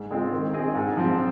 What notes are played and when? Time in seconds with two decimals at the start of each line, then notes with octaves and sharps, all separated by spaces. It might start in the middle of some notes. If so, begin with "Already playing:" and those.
Already playing: G#2
0.11 G#3 C4 F4
0.33 D#3
0.53 C4 D#4 G#4 D#5
0.75 G#2
0.97 F3 C4